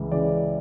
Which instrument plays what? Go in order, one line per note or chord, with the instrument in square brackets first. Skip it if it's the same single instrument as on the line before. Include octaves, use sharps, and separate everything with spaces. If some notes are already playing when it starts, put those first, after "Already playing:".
Already playing: [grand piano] C#2 C#3 E3
C#3 E3 D5